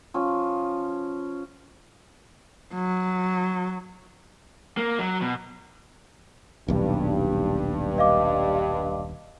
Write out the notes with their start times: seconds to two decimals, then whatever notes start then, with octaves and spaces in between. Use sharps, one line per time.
0.14 F3 C#4
2.74 F#3
4.77 A#3
4.99 F#3
5.22 B2
6.68 D#1 B1 G2
7.98 D#5 F5 D6